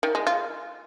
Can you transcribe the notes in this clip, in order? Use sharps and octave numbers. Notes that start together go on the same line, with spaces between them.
D#3
G#3
F4